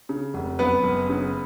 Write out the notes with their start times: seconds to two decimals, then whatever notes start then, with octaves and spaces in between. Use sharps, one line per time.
0.09 C#3
0.34 F1
0.59 F#2 B3 B4
0.84 F#1
1.09 C#3